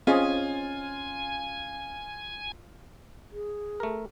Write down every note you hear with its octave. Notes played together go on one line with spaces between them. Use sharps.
C4 C#4 F4 G#4 D#5 G#5
G#4
A3 A#4